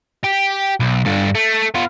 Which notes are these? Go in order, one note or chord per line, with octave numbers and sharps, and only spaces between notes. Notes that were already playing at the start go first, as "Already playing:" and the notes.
G4
B1
G2 D3
A3
B3 F4